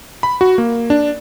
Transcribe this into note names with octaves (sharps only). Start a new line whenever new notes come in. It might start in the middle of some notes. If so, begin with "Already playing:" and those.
B5
F#4
A#3
D4